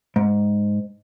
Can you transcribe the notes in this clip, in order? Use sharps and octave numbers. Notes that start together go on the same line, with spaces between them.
G#2